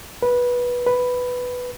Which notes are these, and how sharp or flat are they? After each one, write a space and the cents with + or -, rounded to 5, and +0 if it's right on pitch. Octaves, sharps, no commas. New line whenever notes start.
B4 -15
B4 +5